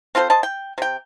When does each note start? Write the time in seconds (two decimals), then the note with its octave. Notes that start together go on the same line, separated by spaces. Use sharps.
0.15 C4 F4 A4 C5
0.30 C5 D#5 A5
0.43 G5
0.78 C3 G5